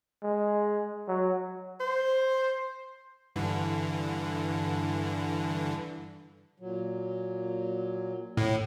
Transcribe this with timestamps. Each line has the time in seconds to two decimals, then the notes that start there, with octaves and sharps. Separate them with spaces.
0.23 G#3
1.08 F#3
1.80 C5
3.36 G2 D3 E3
6.60 A#2 F#3
8.37 A2